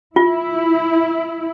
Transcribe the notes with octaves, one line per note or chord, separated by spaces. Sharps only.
E4 F4